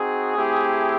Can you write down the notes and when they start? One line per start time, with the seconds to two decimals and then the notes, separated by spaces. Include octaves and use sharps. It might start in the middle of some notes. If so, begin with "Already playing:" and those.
Already playing: C4 D#4 F#4 G#4
0.37 A3 C4 E4 G4